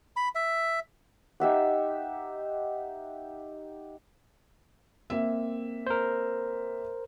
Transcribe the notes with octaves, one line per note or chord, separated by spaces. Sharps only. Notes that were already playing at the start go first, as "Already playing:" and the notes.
B5
E5
D#4 G4 E5 F#5
A#3 C4 E5
A#4 C5